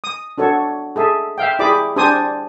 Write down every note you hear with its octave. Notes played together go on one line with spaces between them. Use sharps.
D#6
D4 F#4 A4 C#5
G#4 A4 E5
E5 F5 G5
E4 G4 G#4 D5 B5 D6
D4 G4 C5 D5 G#5 D#6